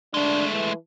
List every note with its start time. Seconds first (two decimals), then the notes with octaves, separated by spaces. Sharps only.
0.14 G#3 A3 D4
0.53 E3